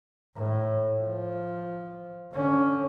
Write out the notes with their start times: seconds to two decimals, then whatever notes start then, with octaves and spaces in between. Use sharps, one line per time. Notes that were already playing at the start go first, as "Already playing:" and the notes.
0.36 A2
1.00 F3
2.33 D3 C#4